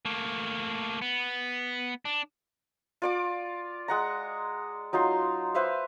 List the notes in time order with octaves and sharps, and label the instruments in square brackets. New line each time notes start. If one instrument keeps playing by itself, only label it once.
[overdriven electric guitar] A3 A#3
B3
D4
[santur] F4 D5 D6
G#3 F#5 A#5
F#3 D#4 F4 C6
B4 C5 E5 F5